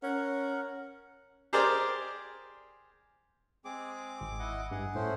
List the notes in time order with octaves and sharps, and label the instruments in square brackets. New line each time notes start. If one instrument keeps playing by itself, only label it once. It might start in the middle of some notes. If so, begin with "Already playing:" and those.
[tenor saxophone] C#4 [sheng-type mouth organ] A#4 F#5
[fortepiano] G4 G#4 A#4 C5 D5
[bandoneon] G#3 C4 G#4 [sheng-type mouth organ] D6
[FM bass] G#1
[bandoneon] E4 D#5 F#5
[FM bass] G2 [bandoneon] G#4 F#5
[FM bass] A2 [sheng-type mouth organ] A3 C#4 C5